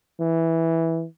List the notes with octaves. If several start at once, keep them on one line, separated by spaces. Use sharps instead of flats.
E3